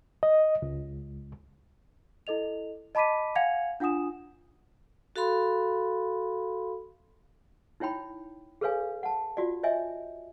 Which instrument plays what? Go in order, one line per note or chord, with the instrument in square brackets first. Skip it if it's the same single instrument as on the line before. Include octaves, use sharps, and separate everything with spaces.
[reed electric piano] D#5
C#2
[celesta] E4 A4 D#5 F7
D#5 A5 B5 D6 B6 D#7
F5 F#5 G#5 G#6 C#7 F7
D4 F4 F#5 G#5 D#6 E7
[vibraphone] F#4 A4 F5 B5 C6
[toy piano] D#4 E4 C#5 G5 B5
G#4 A4 B4 C#5 F5 G#5
F#5 A5
F4 F#4 D5
C#5 D#5 E5 G#5